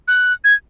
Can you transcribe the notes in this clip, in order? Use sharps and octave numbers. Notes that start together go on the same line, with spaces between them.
F#6
G#6